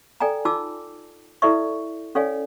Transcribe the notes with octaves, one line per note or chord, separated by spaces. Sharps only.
A4 D5 G5 G#5 A#5
D#4 F4 A5 D6 E6
E4 A4 B4 D5 E5 C#6
C#4 A4 C#5 D5 F5 G#5